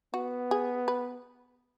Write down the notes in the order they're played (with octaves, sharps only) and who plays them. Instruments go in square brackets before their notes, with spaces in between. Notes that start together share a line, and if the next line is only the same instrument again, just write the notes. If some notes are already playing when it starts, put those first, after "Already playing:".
[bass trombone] B3 [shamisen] F#4
[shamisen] G#4
B4